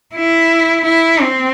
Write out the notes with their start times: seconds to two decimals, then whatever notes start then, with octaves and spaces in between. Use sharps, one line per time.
0.15 E4
0.85 E4
1.21 C4